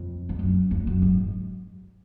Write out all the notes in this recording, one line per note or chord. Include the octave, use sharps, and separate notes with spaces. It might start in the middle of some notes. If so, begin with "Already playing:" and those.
Already playing: F2
G#2
F#2
F2
F#2
G#2